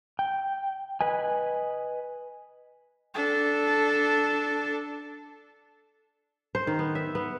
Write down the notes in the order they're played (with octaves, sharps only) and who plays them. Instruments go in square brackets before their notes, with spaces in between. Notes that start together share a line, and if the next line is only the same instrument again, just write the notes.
[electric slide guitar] G5
B4 D#5 G#5
[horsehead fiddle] D4 A4
[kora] C5
D#3
B3
E5
B3